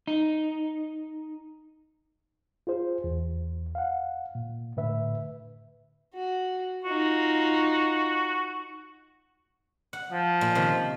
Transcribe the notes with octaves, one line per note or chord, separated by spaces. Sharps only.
D#4
F4 G#4 C5
E2
F5 F#5
A#2
A2 D3 B4 E5
F#4
D#4 F4 F#4
F#5
F3
A#2
C3 D#3